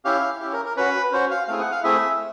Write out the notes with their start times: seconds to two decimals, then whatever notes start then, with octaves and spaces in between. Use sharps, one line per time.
0.05 C#4 E4 G4 F5
0.40 C#4 E4 G4
0.53 A#4
0.65 A#4
0.76 C#4 F#4 B4
1.12 C#4 F#4 C5
1.31 F5
1.48 A3 C4 E4 G#4 F5
1.60 F#5
1.72 F5
1.83 A3 C4 E4 G#4 E5